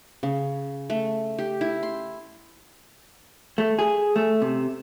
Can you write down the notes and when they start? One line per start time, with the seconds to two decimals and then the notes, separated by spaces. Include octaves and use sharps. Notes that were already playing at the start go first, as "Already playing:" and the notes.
0.23 C#3
0.90 A3
1.38 G4
1.61 E4
1.83 C6
3.58 A3
3.79 G#4
4.16 A3
4.42 C3